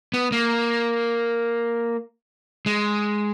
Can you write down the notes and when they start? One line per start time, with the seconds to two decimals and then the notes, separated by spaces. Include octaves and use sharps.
0.14 B3
0.32 A#3
2.66 G#3